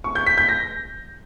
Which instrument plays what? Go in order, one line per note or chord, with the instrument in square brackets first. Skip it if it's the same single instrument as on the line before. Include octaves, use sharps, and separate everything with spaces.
[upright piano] C#6
G6
B6
G6
A#6